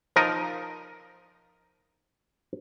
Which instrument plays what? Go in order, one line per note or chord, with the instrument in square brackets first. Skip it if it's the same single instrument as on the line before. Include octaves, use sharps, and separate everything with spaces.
[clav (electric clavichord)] F3 D#4 A#4 D#5